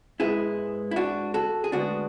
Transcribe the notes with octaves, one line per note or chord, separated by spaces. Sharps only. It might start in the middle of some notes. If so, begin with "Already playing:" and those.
G#2 G#3 B3 E4 G#4
E4
D4 F#4
F#4 A4
G#4
D2 D3 G#3 B3 D4 F#4